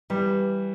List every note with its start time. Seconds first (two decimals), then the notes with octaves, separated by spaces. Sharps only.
0.10 E3 G3